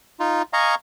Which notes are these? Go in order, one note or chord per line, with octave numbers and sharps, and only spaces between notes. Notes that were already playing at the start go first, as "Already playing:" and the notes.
D#4 F4
D#5 F5 G#5 A#5 C#6